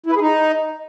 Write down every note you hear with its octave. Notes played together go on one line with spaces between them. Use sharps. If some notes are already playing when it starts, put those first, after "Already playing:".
E4
B4
G#4
D#4